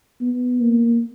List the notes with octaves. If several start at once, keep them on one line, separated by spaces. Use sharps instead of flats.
B3
A#3